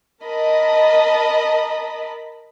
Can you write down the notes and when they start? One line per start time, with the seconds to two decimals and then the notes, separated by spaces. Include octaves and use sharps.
0.23 A#4 D#5 A5 B5